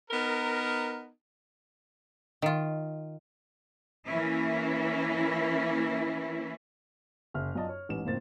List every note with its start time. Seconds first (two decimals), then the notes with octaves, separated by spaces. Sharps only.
0.11 B3 D#4 A#4
2.42 D#3 F4
4.06 E3 A#3 C#4 E4
7.34 F#1 E5 F6
7.55 F#2 F4 D5 D#5 A5
7.69 C#5
7.89 A1 G#2 B4 E7
8.05 F#1 F2 A2 A#3 C4 A6